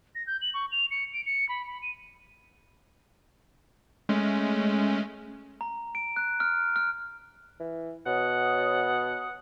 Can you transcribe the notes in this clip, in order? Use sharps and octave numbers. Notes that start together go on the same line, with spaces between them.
A#6
G6
F#7
C#6
F7
C#7
D7
C#7
B5
B5
D#7
G#3 A3 C#4
A#5
D7
F#6
F6
F6
E3
B2 C#5 F#5 D#6